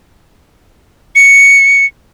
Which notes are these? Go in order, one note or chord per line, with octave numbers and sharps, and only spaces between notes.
C#7